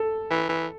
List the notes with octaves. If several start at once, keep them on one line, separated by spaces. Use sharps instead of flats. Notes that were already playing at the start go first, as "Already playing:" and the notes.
Already playing: A4
E3
E3